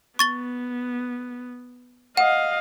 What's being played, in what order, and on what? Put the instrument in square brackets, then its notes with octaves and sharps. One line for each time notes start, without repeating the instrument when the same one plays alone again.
[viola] B3 [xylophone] C#6 A6 G7
[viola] D#5 F5 [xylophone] F#5